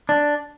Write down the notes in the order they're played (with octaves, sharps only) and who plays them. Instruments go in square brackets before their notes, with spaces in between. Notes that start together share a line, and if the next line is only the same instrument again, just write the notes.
[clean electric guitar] D4